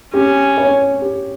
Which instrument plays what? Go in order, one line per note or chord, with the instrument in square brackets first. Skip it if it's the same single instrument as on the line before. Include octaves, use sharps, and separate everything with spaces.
[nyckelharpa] C#4 [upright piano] G4
[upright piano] C#5
G4